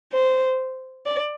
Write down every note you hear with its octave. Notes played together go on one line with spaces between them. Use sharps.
C5
D5